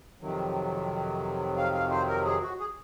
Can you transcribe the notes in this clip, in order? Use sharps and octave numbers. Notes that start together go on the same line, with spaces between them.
F2 C3 D#3 F#3
F5
F5
C5
A#4
G#4
F#4
G#4